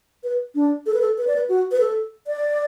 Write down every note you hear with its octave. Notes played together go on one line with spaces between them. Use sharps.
B4
D4
A4
B4
A4
B4
D5
B4
F#4
B4
A4
D5